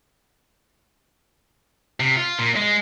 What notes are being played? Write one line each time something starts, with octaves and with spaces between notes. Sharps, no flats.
C3
F4
A#2
G#3